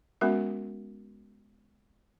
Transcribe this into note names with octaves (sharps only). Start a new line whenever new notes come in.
G#3 B3 C#4 F#4 A#4 E5